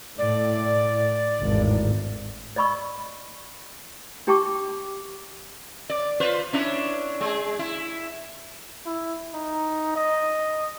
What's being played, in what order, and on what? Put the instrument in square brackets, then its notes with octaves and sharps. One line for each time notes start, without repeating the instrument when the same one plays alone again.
[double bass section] A2 [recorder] D5
[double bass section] G#1 E2 A2
[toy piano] D5 D#5 B5 C#6 E6
D4 G4 G5 A5 C#6 D6
[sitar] D5
F4 B4 C5
C#4 D4 E4
G#3 G#4
E4
[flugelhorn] E4
D#4
D#5